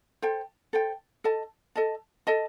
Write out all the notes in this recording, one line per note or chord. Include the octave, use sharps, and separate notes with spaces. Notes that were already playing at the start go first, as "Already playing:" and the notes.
A4 C5 G5
A4 C5 G5
A4 D#5 A5
A4 D#5 A5
A4 D#5 A5